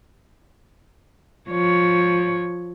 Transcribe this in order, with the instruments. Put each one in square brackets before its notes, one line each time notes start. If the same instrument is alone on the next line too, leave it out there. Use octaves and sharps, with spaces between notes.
[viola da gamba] F3 C#5